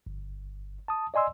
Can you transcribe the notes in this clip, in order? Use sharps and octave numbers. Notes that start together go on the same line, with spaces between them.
G1
A5 D#6
D5 D#5 G#5 C6 E6